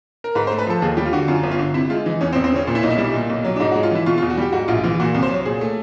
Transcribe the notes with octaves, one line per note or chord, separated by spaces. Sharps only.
A#4
G#2 B4
C5
A3
B4
F3 A4
D#2 G#4
G3 G4
F4
D3 F#4
F#2 F4
G1
F4
D3
C3 E4
G#3 F4
E3 D#4
E2 C#4
C4
E1
C4
C#3 C#4
A#2 F4
E4
B1 D#4
E4
G3
A#2
B1
F#3
D4
G#2 D#4
F#4
G#3
F4
E3 E4
B2 F4
F4
E2
F#4
G3 G4
G#2 F#4
A#1 F4
E3 F4
A#2 F#4
C2
C5
F#3 C#5
A#2 G#4
A3